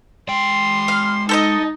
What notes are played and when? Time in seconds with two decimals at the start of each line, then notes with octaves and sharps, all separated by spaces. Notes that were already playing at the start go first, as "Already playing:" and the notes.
0.29 G#3 G5 C6
0.88 F5
1.29 D#4 A4 C5 D#5